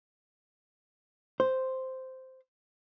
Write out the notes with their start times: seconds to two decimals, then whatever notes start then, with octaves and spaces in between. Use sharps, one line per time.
1.40 C5